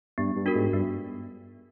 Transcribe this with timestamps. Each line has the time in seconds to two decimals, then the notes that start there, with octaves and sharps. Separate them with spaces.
0.18 G2 B3
0.36 G2
0.46 D4 F#4 A#4
0.55 G#2
0.73 G2 B3